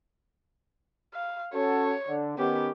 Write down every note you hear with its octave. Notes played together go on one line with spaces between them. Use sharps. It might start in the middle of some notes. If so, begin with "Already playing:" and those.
F5
C#4 F#4 A4 C#5
D3
D#3 B3 C#4 G4